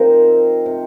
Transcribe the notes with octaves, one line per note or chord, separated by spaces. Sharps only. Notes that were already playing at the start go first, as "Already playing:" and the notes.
Already playing: C3 F3 C4 D#4 A#4 C5
C4
C3